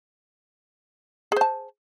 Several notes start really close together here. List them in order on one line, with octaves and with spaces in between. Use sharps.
G#4 C5 A5